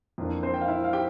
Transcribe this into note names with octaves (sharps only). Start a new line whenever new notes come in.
F2 E3 A#3 D4
C4 C5
G5
F5
E4 E5
F5
G4 G5